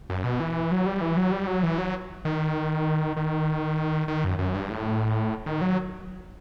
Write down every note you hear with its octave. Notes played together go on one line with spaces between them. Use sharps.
F#2
B2
E3
F#3
G3
E3
F#3
G3
F#3
E3
F#3
D#3
D#3
D#3
F#2
F#2
G2
A2
D#3
F#3